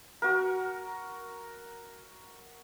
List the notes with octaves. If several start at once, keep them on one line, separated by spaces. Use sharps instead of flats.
F#4 A#4